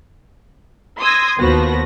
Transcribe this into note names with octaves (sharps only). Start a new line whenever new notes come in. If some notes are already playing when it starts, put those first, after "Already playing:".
C6 D#6 E6 G#6 A#6
D#2 F3 B3 F#4 B4 A#6